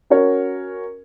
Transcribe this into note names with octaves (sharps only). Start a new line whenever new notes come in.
C#4 F#4 A#4 C#5